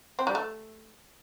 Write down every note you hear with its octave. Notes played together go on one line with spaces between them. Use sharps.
C4
G3
A3